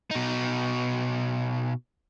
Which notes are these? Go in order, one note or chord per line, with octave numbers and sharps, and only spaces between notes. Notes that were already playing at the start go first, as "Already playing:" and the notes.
B2 D#4